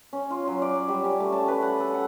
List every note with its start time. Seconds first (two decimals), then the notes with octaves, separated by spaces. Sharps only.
0.13 C#4
0.30 F4
0.47 F#3
0.62 D5
0.88 G3
1.04 C#4
1.20 A3
1.32 A5
1.48 B4
1.62 F#5
1.80 A4
1.94 F#5